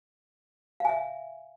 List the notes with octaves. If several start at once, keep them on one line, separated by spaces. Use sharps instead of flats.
E5 F5 G#5